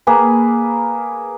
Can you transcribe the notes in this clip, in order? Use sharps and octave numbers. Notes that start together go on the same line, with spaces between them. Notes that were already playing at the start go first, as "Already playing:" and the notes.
A#3 G#4 A#4 B4